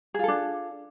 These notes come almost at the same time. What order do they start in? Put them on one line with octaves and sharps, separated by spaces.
G#4 F4 A4 D4